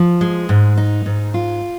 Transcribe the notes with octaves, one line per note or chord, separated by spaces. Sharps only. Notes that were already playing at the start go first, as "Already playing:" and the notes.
Already playing: F3
G#3
G#2
D#4
G#2
F4